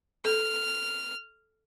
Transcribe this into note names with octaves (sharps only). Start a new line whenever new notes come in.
A4 F6